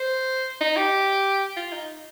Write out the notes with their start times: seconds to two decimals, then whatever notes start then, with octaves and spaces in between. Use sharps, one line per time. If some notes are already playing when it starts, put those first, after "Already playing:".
Already playing: C5
0.61 D#4
0.77 G4
1.57 F4
1.73 D#4